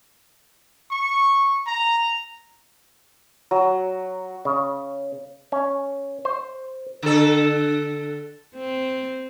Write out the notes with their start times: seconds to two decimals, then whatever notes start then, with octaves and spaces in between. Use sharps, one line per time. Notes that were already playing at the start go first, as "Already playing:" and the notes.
0.91 C#6
1.66 A#5
3.51 F#3
4.45 C#3
5.52 C#4
6.25 C5
7.02 D3 A4
8.55 C4